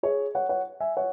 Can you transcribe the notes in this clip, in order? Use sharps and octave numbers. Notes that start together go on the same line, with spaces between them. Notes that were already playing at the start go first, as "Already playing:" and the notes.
G#4 C#5
C#5 F#5
C#5 F#5
E5 G#5
C#5 F#5